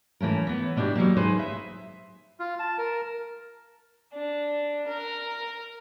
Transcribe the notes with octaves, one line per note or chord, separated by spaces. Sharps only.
E3 A3 C#4 A#4
E3 B3
B2 D4 E4 G4
F#3 G3 A#3
D#4 G#4 B4 C5
E5
F4
A5
A#4
D4
A#4